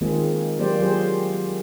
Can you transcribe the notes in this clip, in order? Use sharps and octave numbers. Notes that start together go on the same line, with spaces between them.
D#3 G#3 A#3 C4 F4 G#4
F#3 A#3 G4 C5 D5
F#3 F4 G4 G#4 C5